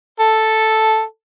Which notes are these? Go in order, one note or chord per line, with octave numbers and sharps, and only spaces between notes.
A4